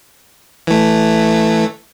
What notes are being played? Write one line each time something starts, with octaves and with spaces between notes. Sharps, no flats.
E3 A3